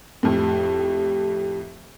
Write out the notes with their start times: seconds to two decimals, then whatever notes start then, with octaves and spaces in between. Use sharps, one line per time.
0.23 F2 A2 G4